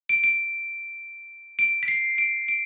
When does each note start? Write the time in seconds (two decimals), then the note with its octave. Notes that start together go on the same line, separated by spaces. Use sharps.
0.09 D7
0.24 D7
1.59 D7
1.83 B6
1.88 C7
2.18 D7
2.48 D7